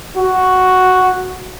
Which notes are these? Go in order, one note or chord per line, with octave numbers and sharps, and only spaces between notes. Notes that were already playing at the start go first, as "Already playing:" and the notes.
F#4